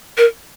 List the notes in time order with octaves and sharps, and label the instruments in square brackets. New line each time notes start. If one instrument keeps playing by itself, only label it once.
[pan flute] A#4